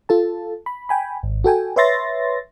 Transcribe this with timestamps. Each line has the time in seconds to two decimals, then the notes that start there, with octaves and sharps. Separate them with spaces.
0.09 F4 A4 A5
0.66 B5
0.89 G5 G#5 B5
1.23 G#1
1.44 F#4 A4 G5 G#5
1.76 B4 C#5 E5 C6 A6 A#6